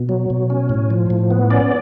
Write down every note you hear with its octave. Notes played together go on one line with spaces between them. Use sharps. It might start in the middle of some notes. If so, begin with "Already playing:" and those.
Already playing: B2
F#3
B2
C#4
A2
F3
A2
B3
C#4 D5